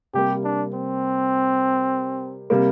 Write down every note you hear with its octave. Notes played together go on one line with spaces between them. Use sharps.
C3 G3 A#3 G4
D4
C4
C3 G3 A#3